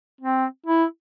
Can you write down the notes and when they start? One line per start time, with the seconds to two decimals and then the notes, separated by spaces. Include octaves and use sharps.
0.21 C4
0.66 E4